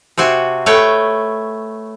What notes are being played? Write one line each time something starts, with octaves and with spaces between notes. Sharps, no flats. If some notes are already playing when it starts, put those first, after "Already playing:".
C3 C4 F#4 G#5
A3 B4 C#5 G5